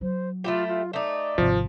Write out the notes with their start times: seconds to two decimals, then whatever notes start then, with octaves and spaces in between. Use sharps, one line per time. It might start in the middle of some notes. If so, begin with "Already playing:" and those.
0.01 F#3 C5
0.44 A3 E4 F4 G4
0.68 F4
0.93 A3 D#4 D5
1.38 G#1 C3 F3